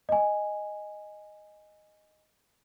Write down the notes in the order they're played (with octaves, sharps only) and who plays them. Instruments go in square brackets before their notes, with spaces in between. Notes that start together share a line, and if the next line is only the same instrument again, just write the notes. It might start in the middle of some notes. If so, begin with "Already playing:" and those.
[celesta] D#5 G#5